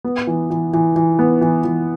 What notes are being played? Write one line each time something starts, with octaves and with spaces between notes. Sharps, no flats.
B3
E3
E3
E3
E3
B3
E3
E3